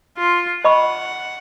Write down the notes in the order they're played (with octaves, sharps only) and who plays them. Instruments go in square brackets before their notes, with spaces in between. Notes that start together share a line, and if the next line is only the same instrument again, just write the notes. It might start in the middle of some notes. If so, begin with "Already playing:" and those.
[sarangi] F4
[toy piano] D#5 B5 C#6 [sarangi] F#5